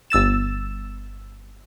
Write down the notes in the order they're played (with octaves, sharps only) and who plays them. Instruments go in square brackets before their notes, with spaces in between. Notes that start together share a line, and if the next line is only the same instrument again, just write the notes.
[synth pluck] G1 E6 A6 E7